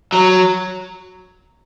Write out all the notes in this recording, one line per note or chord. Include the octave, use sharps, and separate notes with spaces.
F#3